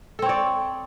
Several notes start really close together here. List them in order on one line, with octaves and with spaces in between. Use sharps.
A4 C4 C#5 D5